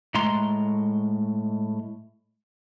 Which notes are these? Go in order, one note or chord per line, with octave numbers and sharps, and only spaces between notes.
A2 G#3 A3 A#5 C6